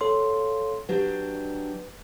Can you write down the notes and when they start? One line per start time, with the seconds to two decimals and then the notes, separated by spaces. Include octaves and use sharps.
0.01 A4 C#5 F5 C6
0.89 F#3 D4 G4 B4